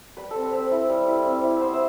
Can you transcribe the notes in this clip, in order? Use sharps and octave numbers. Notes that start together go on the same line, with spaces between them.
G3 B4
C4 A4
B4
C4
E4
G3
E4
C4
E4
B3 C5
E5